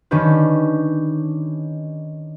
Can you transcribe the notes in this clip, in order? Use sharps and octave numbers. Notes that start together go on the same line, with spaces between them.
D#3 C#4 D4 G4 B4